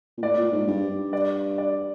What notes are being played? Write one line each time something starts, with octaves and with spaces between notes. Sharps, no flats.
A#2
A2 D5
A#2
G#2
G2
G2
D5
D5